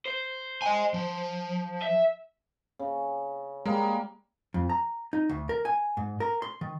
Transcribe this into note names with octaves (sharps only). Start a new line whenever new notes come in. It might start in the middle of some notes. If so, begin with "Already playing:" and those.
C5
D#5 G#5
F3
E5
C#3
G3 G#3 A#3 A#4
F2
A#5
D#4
D2
A#4
G#5
G#2
A#4
C6
D#3